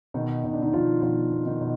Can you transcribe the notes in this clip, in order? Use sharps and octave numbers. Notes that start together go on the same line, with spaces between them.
B2 D#3 D#4
B2 D#4
D4
D#3 D#4
B2 F3 F4
B2 F3 F4
B2
D#3 D#4
B2